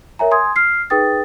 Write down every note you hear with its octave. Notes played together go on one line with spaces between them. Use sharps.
A#4 C#5 E5 G#5 A#5
G#5 C6 D#6 G#6
F6 C7
D#4 G#4 B4 G5 D#6 A6